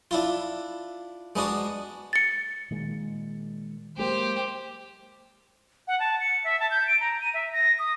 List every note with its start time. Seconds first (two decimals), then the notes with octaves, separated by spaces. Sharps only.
0.11 D4 E4 F4
1.36 G#3 B3 D4 F#4
2.13 A6 C#7
2.71 A#2 D#3 G#3
3.97 F#3 G#3 A#3 G4 C5
5.88 F#5
6.00 A5
6.21 C#7
6.44 E5
6.60 A5
6.71 G6
6.87 D7
7.01 A#5
7.21 D#7
7.34 E5
7.53 A#6
7.79 D#6